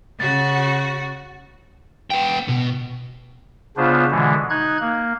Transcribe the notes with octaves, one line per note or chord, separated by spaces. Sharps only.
C#3 F#4 A6
B3 G5
B2
C#3 B3 D4 F4 C5
B2 D3 E3 G#3
D#4 F#6 G#6
A#3